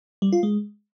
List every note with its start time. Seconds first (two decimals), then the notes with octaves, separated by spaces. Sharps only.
0.22 G3
0.33 F4
0.43 G#3